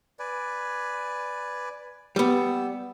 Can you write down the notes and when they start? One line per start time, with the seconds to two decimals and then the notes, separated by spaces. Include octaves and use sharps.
0.19 B4 D5 G#5
2.16 G3 B3 E6